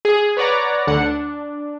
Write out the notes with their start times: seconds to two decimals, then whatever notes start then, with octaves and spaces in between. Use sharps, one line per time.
0.05 G#4
0.37 B4 C#5 D5 F#5 A#5
0.87 D2 D3 F#5 C#7
1.00 D4